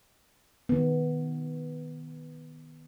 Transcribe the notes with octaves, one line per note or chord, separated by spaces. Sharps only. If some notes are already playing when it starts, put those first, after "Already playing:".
D#3 B3